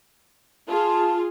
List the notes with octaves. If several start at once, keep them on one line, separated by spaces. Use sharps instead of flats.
F4 G#4 A5